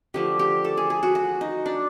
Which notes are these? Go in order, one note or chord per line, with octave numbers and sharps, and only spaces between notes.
D3 F3 A3 G4
G4
A4
G#4
G#4
F#4
F#4
D#4
D4